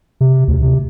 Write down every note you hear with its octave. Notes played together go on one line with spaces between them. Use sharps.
C3
D2
C3